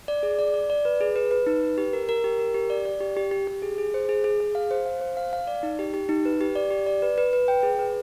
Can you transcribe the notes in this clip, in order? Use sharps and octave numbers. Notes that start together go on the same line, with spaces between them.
D5
G#4
D5
D5
D5
B4
G#4
B4
B4
D#4
B4
G4
A#4
A#4
G4
A#4
G4
D5
D5
G4
G4
G4
G4
G#4
G#4
C5
G#4
G#4
G#4
F5
C5
F5
C5
F5
F5
D5
D#4
G4
G4
D#4
B4
G4
D5
G4
D5
B4
B4
B4
G5
G#4
B4